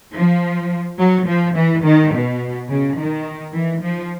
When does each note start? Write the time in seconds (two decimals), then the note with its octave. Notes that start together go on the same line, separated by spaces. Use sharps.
0.14 F3
0.98 F#3
1.27 F3
1.55 E3
1.84 D#3
2.13 B2
2.70 C#3
2.98 D#3
3.54 E3
3.82 F3